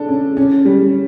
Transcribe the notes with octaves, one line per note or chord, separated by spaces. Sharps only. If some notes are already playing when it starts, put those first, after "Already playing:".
Already playing: D4 A4
C#4
C#4
G3